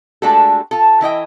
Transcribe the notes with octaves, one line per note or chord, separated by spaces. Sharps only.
G#3 A3 D4 F#4 G4 A4
F4 A4
E3 E4 D#5 G5